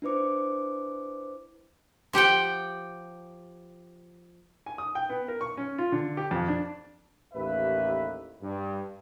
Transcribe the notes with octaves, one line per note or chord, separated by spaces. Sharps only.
D4 E4 B4 C5 D6 C#7
F3 G4 F#5 G5
G#5
D#6
G5
B3
A#4
C#6
C#4
F4
D3
G4
F2
D4
A1 D#2 B4 E5
G2